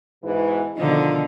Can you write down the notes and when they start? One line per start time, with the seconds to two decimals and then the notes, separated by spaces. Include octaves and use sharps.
0.23 G#2 B2 E3
0.77 B2 D3 D#3 F3 D#4